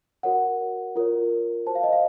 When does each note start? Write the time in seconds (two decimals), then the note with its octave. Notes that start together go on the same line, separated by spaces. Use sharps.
0.23 F#4 A#4 C#5 F#5
0.96 F4 A#4 C#5
1.67 F#4 C5 A5
1.75 F5
1.84 D#5
1.92 F5